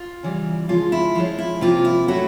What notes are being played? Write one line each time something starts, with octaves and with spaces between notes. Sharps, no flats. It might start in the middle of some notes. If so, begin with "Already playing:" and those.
Already playing: F4
C#3 E3 G3
C#3 F3 G#3 F4
E4
F3 G#3 C#4 F4
E4
C3 F3 A#3 F4
E4
F#3 A3 C#4 E4 F#4